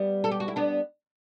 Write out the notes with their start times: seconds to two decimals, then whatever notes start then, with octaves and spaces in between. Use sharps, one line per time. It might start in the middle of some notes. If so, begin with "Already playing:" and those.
Already playing: G3 B3
0.24 A4
0.31 G4
0.40 F#4
0.48 E4
0.56 B3 D4